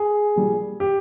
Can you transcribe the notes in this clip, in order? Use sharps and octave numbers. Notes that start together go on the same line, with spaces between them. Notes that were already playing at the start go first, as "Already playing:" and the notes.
Already playing: G#4
A#2 G3
G4